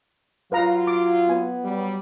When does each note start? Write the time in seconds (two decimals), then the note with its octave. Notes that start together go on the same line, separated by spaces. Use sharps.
0.52 F#3 F4 B4 F5 A#5
0.87 D6
1.29 B3 G#5
1.64 F#3 G3